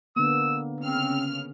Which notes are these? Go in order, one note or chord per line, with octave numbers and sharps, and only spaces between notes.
D3 A#3 B3 E6
C#3 C4 F6